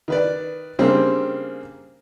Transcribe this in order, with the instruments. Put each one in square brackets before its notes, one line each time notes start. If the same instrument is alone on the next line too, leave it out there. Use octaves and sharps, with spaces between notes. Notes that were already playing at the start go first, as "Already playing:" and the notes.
[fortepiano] D#3 B4 D5
C#3 G3 A#3 C4 D4